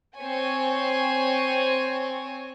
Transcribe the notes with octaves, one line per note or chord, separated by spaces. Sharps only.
C4 C#5 G#5